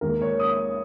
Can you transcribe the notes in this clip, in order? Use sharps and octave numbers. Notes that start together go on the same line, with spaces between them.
D#2 D#3 G#3 A#4
C#5
D#6